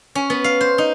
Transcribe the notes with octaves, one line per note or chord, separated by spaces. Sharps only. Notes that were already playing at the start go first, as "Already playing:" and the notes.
C#4
B3
F5
C5
D#4